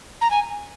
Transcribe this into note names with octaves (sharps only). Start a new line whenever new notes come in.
A#5
G#5